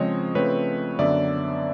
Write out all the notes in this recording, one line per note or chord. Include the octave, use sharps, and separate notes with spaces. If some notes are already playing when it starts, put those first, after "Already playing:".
Already playing: C#3 F3 G#3 C4 C#5 D#5
C#3 F3 A3 C4 B4 C#5
F#2 D3 F#3 B3 D5 E5